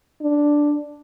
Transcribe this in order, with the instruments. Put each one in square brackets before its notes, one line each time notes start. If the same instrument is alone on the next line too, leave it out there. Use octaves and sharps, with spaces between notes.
[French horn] D4